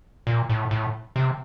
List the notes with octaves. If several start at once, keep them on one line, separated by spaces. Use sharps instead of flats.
A#2
A2
A2
C3